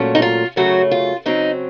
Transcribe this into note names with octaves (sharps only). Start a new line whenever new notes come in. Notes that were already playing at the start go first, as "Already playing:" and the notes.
Already playing: A#2 F#3 A3 C#4
D#4
F4
F#2 C#3 F#3 A3 F#4
F4
C#3 F#3 C4 D#4